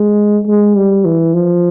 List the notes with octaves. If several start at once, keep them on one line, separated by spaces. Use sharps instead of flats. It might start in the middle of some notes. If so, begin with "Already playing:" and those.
Already playing: G#3
G#3
G3
E3
F3